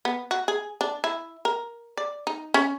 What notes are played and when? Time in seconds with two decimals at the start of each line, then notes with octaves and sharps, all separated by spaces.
0.05 B3
0.31 F#4
0.48 G#4
0.81 D4
1.04 E4
1.45 A#4
1.97 D5
2.27 D#4
2.54 C#4